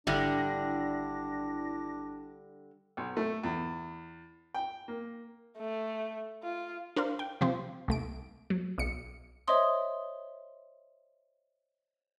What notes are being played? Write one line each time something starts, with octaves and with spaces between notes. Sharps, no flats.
G#1 D3 G3 D4 E4 A#6
B1
A3
E2
G5
A#3
A3
F4
D4 A#4 C5 F5
G5
C3 F3 C4
C2 A3 D7
F#3
B1 C#7
C5 C#5 D#5 E5 C6 D#6